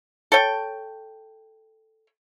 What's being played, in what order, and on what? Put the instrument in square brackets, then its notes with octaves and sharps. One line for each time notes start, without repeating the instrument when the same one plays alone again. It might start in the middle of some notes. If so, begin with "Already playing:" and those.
[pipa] A4 C#5 G5